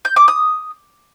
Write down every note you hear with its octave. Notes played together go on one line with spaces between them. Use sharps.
G6
D6
D#6